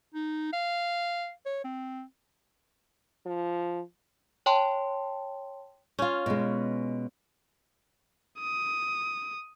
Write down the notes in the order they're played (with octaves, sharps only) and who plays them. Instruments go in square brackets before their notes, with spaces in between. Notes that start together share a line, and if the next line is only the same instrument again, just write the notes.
[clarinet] D#4
F5
C#5
C4
[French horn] F3
[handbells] C#5 G5 A5 C6
[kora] C#4 F4
[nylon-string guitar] B2 G#3
[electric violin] D#6